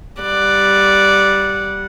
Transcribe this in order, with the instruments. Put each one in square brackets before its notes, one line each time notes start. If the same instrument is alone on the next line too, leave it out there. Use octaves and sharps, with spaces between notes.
[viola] G3 F#5 [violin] D5